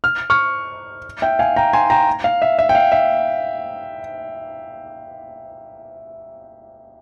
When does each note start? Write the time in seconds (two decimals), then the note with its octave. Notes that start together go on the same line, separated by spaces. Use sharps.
0.04 F6
0.30 C#6 F6
1.22 E5 G5
1.39 F5 G#5
1.56 G5 A#5
1.73 G#5 C6
1.90 G5 A#5
2.24 F5
2.42 E5
2.59 E5
2.69 G5
2.75 F5
2.92 E5